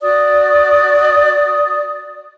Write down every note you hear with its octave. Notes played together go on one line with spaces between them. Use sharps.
F#4 D5 D#6